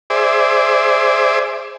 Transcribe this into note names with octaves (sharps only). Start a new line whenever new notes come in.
G#4 C5 D5 E5